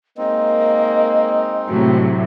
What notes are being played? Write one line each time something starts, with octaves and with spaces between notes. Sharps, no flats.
G#3 A#3 C4 D#4 D#5
A2 C3 F#3 F#4